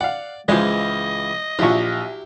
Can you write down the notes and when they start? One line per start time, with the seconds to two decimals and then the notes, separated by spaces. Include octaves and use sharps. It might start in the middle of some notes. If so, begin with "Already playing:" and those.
0.01 D5 F5 F#5
0.48 C#2 E3 F3 G#3 D#5 F5
1.59 A#1 F#3 E4 F4 G4 C#6